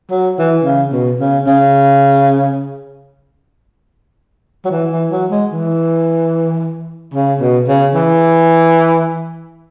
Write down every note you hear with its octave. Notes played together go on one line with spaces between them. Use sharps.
F#3
E3
C#3
B2
C#3
C#3
F#3
E3
E3
F#3
G#3
E3
C#3
B2
C#3
E3